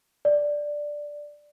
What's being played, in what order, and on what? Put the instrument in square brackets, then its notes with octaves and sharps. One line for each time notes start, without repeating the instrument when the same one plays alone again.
[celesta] D5